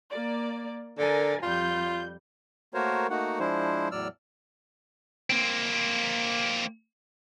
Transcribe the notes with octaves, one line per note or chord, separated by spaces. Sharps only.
A#3 D5
D3 A#4 G#5 A6
F2 G3 F4 G6
A3 A#3 F#4 A#4 C5 C#5
A3 A#3 D#4 F#4 F#5
F3 G#3 D4 E4 C5
E2 A2 F#3 D5 E6 F6
A#3 C4